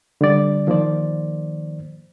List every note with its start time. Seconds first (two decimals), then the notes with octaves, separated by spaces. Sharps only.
0.21 D3 G3 D5
0.67 D#3 F3 A#3 C5 D5